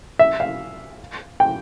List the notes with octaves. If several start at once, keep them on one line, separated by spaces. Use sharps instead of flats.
E5
F5
G5